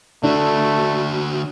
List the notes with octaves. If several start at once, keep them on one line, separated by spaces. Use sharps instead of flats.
D3 A3 D4 F#4